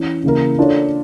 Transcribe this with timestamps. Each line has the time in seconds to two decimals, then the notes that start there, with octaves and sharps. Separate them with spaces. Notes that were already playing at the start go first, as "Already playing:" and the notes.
Already playing: E3 C#4
0.24 C#3 E3 A#3 E4 A#4
0.57 A#3 D4 F4 A4 C#5